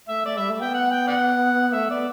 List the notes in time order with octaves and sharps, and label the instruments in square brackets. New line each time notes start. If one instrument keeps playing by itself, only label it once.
[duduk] A3 [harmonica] E5
[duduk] A3 [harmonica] D5
[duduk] G3 [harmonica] E5
[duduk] A3
[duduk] B3 [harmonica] G5
[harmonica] F#5
G5
D5 F#5
[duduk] A3 [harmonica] E5
[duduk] B3 [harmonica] D5